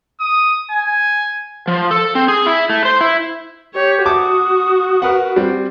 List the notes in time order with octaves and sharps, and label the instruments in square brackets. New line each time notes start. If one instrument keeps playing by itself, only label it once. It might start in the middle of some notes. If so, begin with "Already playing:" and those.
[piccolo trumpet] D#6
G#5
[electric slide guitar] F3
A4
C4
G#4
E4
A3
C5
E4
[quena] G4 [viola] C#5
[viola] F#4 [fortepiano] A5 D6 [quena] D#6
[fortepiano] A#4 B4 F#5
G3 C4